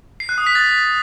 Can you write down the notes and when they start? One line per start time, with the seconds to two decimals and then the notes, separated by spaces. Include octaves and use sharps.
0.20 C7
0.29 F#6
0.38 D#6
0.47 B6
0.55 A6